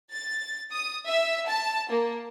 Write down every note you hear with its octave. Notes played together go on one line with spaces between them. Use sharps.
A6
D#6
E5
A5
A#3